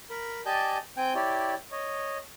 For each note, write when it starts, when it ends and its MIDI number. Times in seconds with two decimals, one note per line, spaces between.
0.10 0.41 70
0.10 0.41 83
0.46 0.78 67
0.46 0.78 74
0.46 0.78 75
0.46 0.78 80
0.46 0.78 81
0.46 0.78 91
0.97 1.13 60
0.97 1.13 79
0.97 1.13 80
0.97 1.13 91
1.15 1.55 64
1.15 1.55 67
1.15 1.55 73
1.15 1.55 74
1.71 2.18 73
1.71 2.18 75